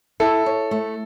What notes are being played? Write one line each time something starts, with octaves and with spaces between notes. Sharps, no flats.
E4 A4
C#5
A3